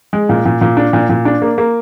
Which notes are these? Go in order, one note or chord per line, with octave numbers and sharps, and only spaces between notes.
G#3
A#2
A#2
A#2
D4
A#2
A#2
D4
A#3
A#3